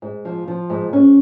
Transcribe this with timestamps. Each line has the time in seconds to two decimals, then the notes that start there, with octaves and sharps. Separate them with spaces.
0.02 G#2
0.25 F3
0.48 F3
0.70 G#2
0.93 G#2 C#4